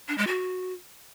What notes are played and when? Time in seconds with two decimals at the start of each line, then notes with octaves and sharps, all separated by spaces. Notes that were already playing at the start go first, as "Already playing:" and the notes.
0.08 D4
0.18 G#3
0.27 F#4